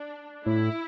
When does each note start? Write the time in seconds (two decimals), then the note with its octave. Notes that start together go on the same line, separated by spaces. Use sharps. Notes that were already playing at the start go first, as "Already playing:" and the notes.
Already playing: D4
0.46 A2 E4